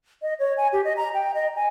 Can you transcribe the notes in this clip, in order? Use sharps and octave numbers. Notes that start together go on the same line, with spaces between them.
D#5
C#5
G#5
G4
D#5
A#5
G5
D#5
G#5